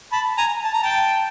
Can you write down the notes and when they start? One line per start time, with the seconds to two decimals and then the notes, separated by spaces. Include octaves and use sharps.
0.12 A5 B5
0.37 G#5 A#5
0.64 A5
0.74 A#5
0.83 G5 A5